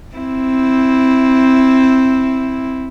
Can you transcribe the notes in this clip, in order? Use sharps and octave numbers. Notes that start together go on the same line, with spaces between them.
C4 E4